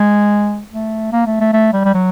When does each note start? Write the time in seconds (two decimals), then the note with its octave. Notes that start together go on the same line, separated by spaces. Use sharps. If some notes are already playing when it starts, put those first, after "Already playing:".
Already playing: G#3
0.72 A3
1.12 A#3
1.26 A3
1.40 A3
1.53 A3
1.73 G3
1.84 G3
1.94 F#3